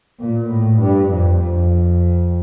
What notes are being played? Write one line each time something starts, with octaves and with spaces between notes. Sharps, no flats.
A#2
A2
G2
F2
F2